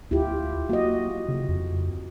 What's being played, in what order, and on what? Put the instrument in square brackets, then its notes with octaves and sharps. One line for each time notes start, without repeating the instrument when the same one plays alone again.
[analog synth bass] D2 [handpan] E4 F4 G4
[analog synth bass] A#3 [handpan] F#4 D#5
[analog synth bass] C#3
F2